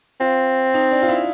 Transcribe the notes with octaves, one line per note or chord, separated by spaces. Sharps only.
C4 F4
D#4
D4
F4
E4